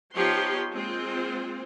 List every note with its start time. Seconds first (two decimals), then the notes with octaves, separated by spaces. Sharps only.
0.16 F3 B3 D#4 G4 C#5 C6
0.73 G#3 A#3 C4 F4 C5